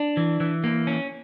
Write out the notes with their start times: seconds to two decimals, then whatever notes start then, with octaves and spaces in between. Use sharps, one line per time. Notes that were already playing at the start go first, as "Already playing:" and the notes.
Already playing: D4
0.17 E3
0.40 E3
0.64 A#3
0.87 C#4